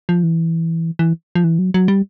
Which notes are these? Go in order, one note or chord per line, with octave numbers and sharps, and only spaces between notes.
F3
E3
E3
F3
E3
F#3
F#3
G3